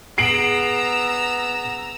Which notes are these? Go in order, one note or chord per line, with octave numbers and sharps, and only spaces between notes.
B3 G#4 A#5 E6 C7 D7 F#7